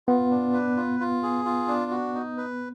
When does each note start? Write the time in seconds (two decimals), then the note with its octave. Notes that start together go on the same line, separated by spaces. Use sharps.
0.08 B3 F4
0.31 D4
0.53 B4
0.77 F4
1.00 F4
1.23 G#4
1.45 F4
1.68 D4
1.91 F#4
2.14 D#4
2.37 B4